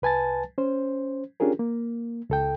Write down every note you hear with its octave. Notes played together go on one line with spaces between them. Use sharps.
C2 B4 G#5 A5 A6
C#4 C5
C#4 D4 F4 G4 G#4 A#4
A#3
C#2 A4 G5